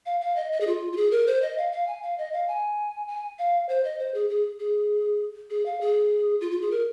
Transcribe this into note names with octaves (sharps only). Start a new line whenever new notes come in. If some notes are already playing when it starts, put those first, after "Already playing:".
F5
F5
D#5
D#5
G#4
F4
F4
G#4
A#4
C5
D#5
F5
F5
G#5
F5
D#5
F5
G#5
G#5
F5
C5
D#5
C5
G#4
G#4
G#4
G#4
F5
G#4
F4
F4
G#4
A#4